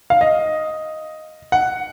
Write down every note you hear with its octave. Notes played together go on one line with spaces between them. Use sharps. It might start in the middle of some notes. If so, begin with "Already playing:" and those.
F5
D#5
F#5